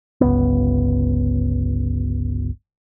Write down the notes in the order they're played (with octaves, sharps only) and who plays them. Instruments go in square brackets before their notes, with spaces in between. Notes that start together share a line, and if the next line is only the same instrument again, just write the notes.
[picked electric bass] G1 C#2 B3